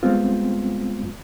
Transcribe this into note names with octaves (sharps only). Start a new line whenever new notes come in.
G3 G#3 B3 C4 F4